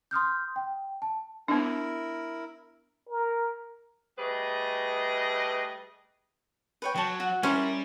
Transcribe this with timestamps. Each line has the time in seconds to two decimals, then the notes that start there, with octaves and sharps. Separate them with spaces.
0.11 C6 D#6 F6 G6
0.56 G5
1.02 A5
1.48 B3 D4 E4 A#4
3.09 A#4
4.19 G3 A3 G#4 B4 D#5
6.82 B4 C#5 G5
6.96 F#3 C#5 A5
7.20 F#4
7.43 G3 C#4 E4 A#4 C6